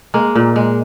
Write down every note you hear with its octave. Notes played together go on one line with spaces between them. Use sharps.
G#3 A#3
A#2
G#3